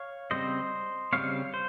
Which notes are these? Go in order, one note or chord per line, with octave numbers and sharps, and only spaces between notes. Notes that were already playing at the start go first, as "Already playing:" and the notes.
Already playing: C#5 F5
C#3 G3 C4 C5 D#5
C#3 G3 C4 C#5 F5
C5